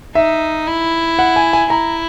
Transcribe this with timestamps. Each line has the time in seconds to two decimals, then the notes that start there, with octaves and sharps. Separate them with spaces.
0.15 D#4 E5
0.67 E4
1.19 F#5
1.36 G#5
1.53 G#5
1.70 E4 A#5